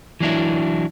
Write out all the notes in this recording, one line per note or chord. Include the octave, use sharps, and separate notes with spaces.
E3 F#3 D4 E4